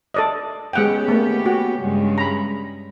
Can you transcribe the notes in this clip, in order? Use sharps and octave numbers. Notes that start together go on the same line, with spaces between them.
A4 D5 D#5
G#3 B3 C#4 G4 F#5 G5
A3 A#3
F#4
G2 C#3 G#3
A#5 B5